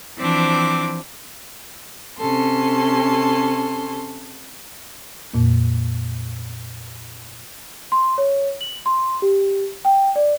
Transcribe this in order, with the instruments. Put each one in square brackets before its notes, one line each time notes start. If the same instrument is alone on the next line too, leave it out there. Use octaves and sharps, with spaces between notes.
[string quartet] E3 F3 C4 D4 D6
C3 C#4 A4 C6
[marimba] F2 A#2 A#3
[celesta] C6
C#5
F#7
C6
G4
G5
D5